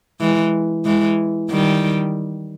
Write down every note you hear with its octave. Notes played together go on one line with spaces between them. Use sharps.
E3 G#3
E3 G#3
D#3 G3